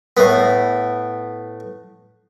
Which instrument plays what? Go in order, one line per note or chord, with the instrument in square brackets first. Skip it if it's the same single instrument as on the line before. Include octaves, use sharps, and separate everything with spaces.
[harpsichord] A2 B3